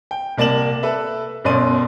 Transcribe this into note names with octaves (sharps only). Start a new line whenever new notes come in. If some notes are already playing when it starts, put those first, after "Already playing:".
G5
C2 A#3 D5 A5 E7 F#7
A4 B4 E5
G1 F#2 B2 D5 C6 D#7